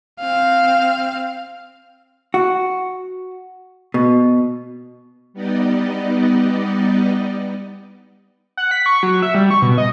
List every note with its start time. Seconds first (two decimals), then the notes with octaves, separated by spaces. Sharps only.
0.20 C4 F5
2.34 F#4
3.94 B2
5.33 G3 B3 D#4 D5 D#5
8.57 F#5
8.71 B6
8.86 C#6
9.03 F#3
9.22 E5
9.35 G3
9.51 C#6
9.62 B2
9.78 D#5